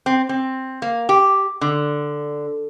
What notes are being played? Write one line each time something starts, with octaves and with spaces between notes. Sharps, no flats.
C4
C4
A#3
G4
D3